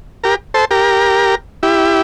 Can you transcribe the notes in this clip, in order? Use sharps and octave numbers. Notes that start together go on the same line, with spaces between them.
G4 A#4
A4 C5
G4 A#4
E4 G4